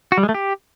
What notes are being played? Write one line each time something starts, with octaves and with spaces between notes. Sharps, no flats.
F#4
G3
G#3
A3
G4